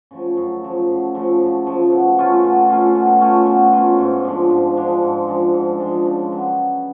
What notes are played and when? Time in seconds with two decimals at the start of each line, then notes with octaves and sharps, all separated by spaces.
0.11 C#3 F3 A3
0.37 F#2
0.63 C#3 F3 A3
0.89 F#2
1.15 C#3 F3 A3
1.41 F#2
1.66 C#3 F3 A3
1.92 B2
2.18 A3 C#4 F4
2.44 B2
2.69 A3 C#4 F4
2.95 B2
3.21 A3 C#4 F4
3.47 B2
3.73 A3 C#4 F4
3.98 G#2
4.25 F3 G#3 D4
4.50 G#2
4.76 F3 G#3 D4
5.02 G#2
5.27 F3 G#3 D4
5.54 G#2
5.79 F3 G#3 D4
6.05 C#3
6.31 F#3 B3
6.57 C#3